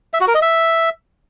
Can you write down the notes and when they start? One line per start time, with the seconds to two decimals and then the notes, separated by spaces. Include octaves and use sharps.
0.13 E5
0.21 F#4
0.28 A#4
0.35 D#5
0.42 E5